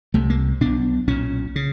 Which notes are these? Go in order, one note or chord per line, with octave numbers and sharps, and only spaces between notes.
C2 C3 A3
A#3
B1 B2 D4
B1 A#2 C#4
C#3